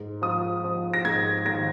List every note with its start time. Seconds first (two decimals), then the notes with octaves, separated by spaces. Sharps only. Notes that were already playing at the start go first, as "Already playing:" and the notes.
Already playing: G#2
0.22 F3 D#6
0.64 F3
0.94 A#6
1.05 G#2 G#6
1.46 G#1 A#6